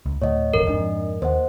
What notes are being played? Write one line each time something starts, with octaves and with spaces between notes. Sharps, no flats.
C#2
D2 A2 C#5 D#5 F#5
E1 A1 F2 A#4
F2 G#2 D4 D#5
D#2 C5 D#5 F#5